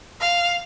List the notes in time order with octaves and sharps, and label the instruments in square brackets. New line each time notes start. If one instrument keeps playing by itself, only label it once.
[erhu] F5